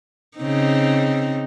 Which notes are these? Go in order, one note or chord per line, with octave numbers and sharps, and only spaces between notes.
C#3 C4 D#4